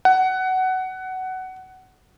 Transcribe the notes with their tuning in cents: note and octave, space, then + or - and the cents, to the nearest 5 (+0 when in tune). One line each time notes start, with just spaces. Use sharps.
F#5 +15